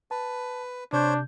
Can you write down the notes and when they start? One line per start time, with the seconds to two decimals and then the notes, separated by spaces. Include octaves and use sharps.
0.11 B4 A5
0.93 C3 D4 C5 C#5 G6